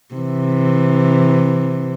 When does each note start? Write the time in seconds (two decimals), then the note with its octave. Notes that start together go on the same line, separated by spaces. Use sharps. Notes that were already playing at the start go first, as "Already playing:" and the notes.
0.14 C3 E3